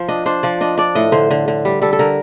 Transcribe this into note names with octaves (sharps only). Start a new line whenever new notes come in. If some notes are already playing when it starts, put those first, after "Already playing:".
Already playing: F3 C5
D4 D#5
D4 C5
F3 D5
D4 D#5
D4 D5
A2 D#5
D3 C5
D3
D3
G3
G3 A4
A4
D3 A#4